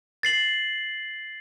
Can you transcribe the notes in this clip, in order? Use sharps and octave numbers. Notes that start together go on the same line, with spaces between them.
A6 C7 F#7